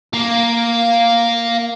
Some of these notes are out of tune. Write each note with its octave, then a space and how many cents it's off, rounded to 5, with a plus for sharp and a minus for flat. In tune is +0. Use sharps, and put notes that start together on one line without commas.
A#3 +0 F5 +0